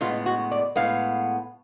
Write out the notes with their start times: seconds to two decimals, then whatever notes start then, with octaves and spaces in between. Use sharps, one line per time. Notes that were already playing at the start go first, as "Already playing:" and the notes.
0.01 A2 G#3 B3 F4
0.26 F#4
0.52 D5
0.76 A2 G#3 B3 F5